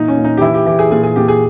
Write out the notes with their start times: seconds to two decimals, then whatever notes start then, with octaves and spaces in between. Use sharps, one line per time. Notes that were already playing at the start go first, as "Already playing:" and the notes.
Already playing: A#2 E3 D#4
0.08 C#4
0.17 A#2
0.24 D#4
0.37 G4
0.41 E3 E4
0.54 G4
0.66 E3 G4
0.79 G#4
0.91 A#2 G#4
1.03 G#4
1.16 A#2 G4
1.28 G#4